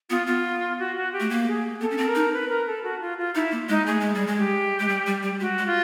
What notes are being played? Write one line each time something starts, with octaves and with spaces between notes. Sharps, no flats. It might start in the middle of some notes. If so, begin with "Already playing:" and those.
B3 F4
B3 F4
F#4
F#4
G4
A3
A#3
G#4
B3 A4
C#4
C4
A#4
D#4
B4
A#4
A4
F#4
F4
F4
D#4 E4
A#3
G#3 D#4
A3 G#4
G#3
G3
G#3
G4
G#3
G3
G3
G3
G#3 F#4
G#3
F4